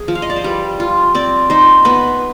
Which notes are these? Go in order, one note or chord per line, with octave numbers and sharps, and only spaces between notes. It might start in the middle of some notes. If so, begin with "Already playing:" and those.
Already playing: G#4
F3
F5
D#5
D5
C5
G3 B4
F4
C4 D5
D#4 C5
B3 B4